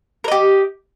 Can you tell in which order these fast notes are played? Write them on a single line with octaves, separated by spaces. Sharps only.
A#4 D#5 G4